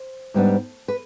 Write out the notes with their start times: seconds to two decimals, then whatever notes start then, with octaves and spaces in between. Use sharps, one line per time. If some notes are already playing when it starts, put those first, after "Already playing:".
Already playing: C5
0.34 G#2 G3 B3 D4
0.88 B4